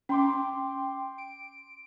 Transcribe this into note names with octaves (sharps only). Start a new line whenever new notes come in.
C#4 G5 C6 D6
D7